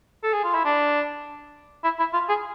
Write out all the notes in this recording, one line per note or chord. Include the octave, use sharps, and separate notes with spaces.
A4
G#4
F4
E4
D4
E4
E4
F4
G#4